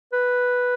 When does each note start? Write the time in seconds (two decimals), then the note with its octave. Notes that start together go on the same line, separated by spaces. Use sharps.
0.13 B4